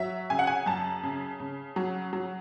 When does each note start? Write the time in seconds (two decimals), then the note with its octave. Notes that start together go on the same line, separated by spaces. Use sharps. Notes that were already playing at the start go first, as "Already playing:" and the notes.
Already playing: F#3 E5
0.30 C#3 G#5
0.39 F#5
0.47 G#5
0.66 F#2 A5
1.03 C#3
1.40 C#3
1.76 F#3
2.13 F#3